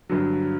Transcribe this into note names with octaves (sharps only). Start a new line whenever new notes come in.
G2 D3 F#3